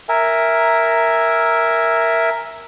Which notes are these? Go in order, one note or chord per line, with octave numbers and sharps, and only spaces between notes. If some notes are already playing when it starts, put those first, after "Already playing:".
A#4 E5 G#5